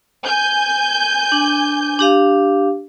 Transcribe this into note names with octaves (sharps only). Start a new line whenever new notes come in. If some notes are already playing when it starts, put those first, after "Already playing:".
G#5 G6
D4
D4 G4 F5